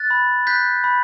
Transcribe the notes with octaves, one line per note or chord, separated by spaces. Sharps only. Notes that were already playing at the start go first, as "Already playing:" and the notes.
Already playing: F#6 A6
B5
F#6 G6 B6
B5